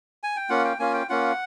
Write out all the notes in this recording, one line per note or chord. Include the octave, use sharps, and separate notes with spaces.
G#5
G5
A#3 C#4 F4 F#5
G5
A#3 C#4 F4 G#5
G5
A#3 C#4 F4 F#5